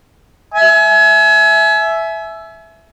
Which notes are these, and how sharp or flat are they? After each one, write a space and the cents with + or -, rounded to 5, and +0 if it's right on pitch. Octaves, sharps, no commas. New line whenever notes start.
E5 +0 G#5 +35